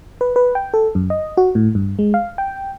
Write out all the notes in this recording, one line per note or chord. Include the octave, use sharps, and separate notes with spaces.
B4
B4
G5
A4
F#2
D#5
F#4
A2
G2
G#3
F5
G5